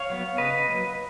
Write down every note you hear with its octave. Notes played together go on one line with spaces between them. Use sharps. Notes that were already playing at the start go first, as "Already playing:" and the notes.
Already playing: C#5 F5
F#3 B3
C#3 B4 D#5
F#3 A#3